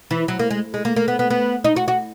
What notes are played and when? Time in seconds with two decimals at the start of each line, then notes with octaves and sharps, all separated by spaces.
0.11 E3
0.28 F#3
0.39 A#3
0.51 G#3
0.74 G#3
0.85 A#3
0.96 A#3
1.08 B3
1.19 B3
1.30 B3
1.64 D#4
1.76 F#4
1.88 F#4